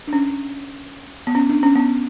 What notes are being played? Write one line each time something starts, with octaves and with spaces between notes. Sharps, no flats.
D4
C#4
B3
C#4
D4
C#4
B3